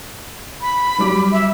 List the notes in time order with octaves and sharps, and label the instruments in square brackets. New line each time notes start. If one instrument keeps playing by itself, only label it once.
[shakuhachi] B5
[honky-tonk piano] F#3 G3 D6
[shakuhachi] E5